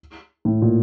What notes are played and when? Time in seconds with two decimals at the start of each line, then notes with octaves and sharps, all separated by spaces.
0.45 A2
0.62 A#2